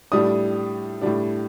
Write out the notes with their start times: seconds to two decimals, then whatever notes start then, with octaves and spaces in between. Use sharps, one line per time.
0.12 A2 G3 D4 D#6
1.01 A2 G3 D4